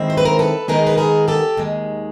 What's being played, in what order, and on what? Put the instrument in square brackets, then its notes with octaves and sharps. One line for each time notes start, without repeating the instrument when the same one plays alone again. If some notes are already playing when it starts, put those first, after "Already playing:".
Already playing: [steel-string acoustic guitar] D#3 G#3 C4 E4
C5
B4
A#4 C5
A4 B4
D#3 G#3 B3 D#4 G#4 A#4
B4
G#4 A#4
G4 A4
D#2 D#3 G#3